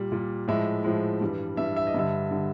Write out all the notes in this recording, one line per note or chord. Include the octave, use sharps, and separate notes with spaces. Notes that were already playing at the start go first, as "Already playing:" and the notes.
Already playing: A#2 G3
A#2 G3
A2 F3 G#3 E5
A2 F3 G#3
G2 E3 G3
G2 E3 G3 E5
E5
D#5
G2 D3 G3 E5
D3 G3